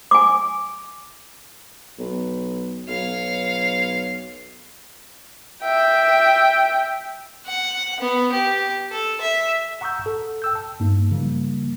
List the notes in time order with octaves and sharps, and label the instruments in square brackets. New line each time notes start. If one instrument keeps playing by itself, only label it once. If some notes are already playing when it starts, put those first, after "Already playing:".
[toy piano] G#5 D6
[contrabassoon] B1
[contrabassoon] B1 [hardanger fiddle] C#5 F5
[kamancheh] E5 G5
[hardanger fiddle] F#5
B3
G4
A4
E5
[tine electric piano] F#5 A#5 C#6 D#6 E6 G6
A4
G5 E6 G6
A5
G2 A#3 D#4
C#3 F3 G3 A#3